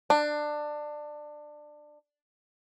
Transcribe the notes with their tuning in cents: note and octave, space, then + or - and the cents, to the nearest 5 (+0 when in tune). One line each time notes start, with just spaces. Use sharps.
D4 +20